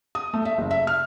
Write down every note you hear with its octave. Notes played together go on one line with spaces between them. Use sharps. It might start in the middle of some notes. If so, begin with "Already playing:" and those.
D#6
A3
E5
F#1
E5
F6